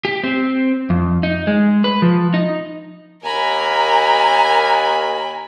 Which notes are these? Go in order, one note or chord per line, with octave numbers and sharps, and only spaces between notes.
G4
C4
F2
D#4
G#3
B4
F3
D#4
D#2 A#4 G#5 A#5 B5